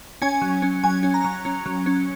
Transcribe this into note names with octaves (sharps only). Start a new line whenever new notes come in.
C#4 G#5
F#3
C#4
F#3 G#5
C#4
A#5
F#3
C#4
F#3
C#4